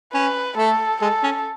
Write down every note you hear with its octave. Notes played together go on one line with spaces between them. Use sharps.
C#4 B4
A3 A4
G#3 A4
C#4